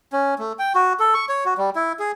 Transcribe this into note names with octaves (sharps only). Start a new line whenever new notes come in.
C#4
A3
G5
F#4
A4
C#6
C#5
F#4
G3
E4
G#4